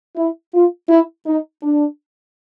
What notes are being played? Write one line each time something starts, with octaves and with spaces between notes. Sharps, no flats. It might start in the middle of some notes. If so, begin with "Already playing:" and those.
E4
F4
E4
D#4
D4